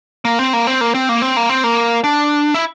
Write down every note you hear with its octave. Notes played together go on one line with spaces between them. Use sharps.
A#3
C4
A#3
C4
A#3
C4
A#3
C4
A#3
C4
A#3
D4
E4